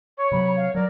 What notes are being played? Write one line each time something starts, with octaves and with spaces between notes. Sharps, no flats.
C#5 C#6
C3 F#3 B5
F5
F#3 A#4 D5